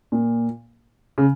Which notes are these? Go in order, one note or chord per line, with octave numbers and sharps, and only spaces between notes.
A#2
C#3